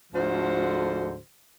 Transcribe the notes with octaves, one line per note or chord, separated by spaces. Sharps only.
D2 G#2 D3 F3 F#4 C5